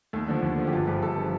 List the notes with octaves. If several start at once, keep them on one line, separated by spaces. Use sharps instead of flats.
D#2 A3
D3 F3
D#2
D3 F3
G4
G1 F4
G2 F3 G4
G1 A4
F3 A4